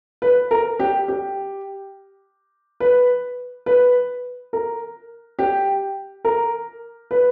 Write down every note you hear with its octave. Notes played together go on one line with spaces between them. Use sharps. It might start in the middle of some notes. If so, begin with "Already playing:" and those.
B4
A#4
G4
G4
B4
B4
A#4
G4
A#4
B4